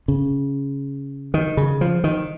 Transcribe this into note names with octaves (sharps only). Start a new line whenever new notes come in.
C#3
D#3
C#3
F3
D#3